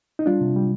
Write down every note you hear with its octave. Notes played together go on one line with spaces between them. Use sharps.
D#4
G3 D4 F4
C3
G3